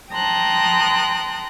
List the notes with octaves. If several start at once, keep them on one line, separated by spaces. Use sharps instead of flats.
G5 A5 A#5 C6 D#6 F#6